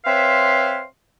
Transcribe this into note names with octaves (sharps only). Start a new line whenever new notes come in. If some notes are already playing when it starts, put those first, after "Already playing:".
C4 B4 C#5 E5 F5 C6